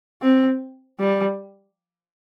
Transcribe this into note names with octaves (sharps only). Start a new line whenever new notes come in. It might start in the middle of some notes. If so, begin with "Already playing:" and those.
C4
G3